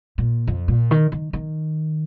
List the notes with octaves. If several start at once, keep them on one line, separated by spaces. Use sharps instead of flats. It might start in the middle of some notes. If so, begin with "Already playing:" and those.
A#2
F2
A#2
D#3
D#3
D#3